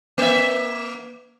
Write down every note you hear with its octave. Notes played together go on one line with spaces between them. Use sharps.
A#3 E5